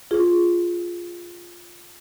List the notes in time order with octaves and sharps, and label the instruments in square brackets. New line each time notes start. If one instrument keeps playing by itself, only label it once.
[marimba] F4 G#4